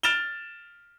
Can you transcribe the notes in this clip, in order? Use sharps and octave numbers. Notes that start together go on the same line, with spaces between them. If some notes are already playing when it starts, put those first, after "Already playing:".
F6 A6 D7 E7 F7 G7